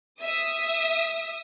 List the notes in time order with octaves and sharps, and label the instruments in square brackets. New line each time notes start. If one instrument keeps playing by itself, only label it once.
[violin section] E5 D#6